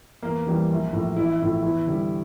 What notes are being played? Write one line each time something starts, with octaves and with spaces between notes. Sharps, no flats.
E2 A#3
E3 G3
A#1
A2 F3
A1 E4
A2 F3
E2 E4
D3 G3